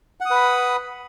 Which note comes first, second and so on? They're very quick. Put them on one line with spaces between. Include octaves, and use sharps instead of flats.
F#5 D#6 B4 B5